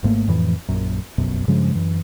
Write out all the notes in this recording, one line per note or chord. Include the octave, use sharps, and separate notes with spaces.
G#1 G#2 A3 A#3
F2 A2 E3 F3
A#1 F#2
F1 B1 F#2 B2
G2 C#3 F3 G#3
F#2 E3